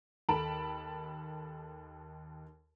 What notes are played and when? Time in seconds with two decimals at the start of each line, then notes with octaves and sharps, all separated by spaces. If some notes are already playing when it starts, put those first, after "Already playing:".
0.29 D#2 A4 A5 B5 D7